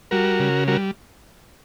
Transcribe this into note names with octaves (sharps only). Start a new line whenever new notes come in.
G3 F#4 A#4
C#3
G3 F#4 A#4